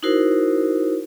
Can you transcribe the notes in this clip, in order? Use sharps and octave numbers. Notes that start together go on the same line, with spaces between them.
D#4 E4 F#4 A#4 C5